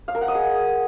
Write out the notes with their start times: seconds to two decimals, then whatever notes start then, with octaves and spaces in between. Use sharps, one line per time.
0.08 F5
0.15 A#4
0.21 F#5
0.28 D#5
0.35 G#4